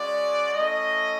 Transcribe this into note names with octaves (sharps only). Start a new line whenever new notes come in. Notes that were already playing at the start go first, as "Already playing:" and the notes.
Already playing: G#3 C#4 F#4 D5
A3 C#4 E4 D#5